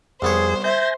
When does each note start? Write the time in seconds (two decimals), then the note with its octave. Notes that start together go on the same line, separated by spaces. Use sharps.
0.22 C2 F2 B3 G#4 C5 C#5
0.64 C5 E5 G#5 G6 A#6